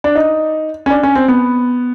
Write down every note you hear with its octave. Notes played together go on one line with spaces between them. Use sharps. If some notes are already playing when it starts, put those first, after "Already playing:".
D4
D#4
C#4
D4
C#4
C4
B3